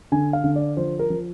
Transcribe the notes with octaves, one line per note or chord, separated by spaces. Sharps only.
D3 G#5
F5
D3
D5
F3 C5
A#4
F3